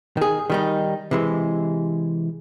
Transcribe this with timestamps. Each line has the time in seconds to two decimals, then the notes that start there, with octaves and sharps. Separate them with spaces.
0.17 D#3 G#4
0.50 D#3 G3 D#4
1.11 C3 E3 G#3